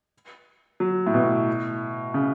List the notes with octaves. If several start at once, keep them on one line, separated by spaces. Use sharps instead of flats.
F#3
A2
B2
C#3